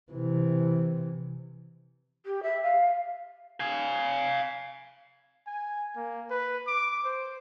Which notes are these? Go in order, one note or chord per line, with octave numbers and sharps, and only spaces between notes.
C3 E3
G4
E5
F5
F5 G#5
G#5
A#3
B4
D6
C5